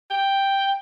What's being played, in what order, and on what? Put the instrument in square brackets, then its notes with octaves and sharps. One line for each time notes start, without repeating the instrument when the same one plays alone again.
[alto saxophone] G5